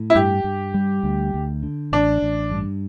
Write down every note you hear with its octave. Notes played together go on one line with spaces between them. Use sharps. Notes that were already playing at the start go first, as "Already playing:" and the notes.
Already playing: A2
E4
G2 G4
G2
G3
D2
D2
D3
A1 D4
A1
G2